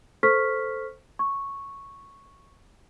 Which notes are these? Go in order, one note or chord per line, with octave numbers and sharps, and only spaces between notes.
A4 C5 C#6 F6 B6
C#6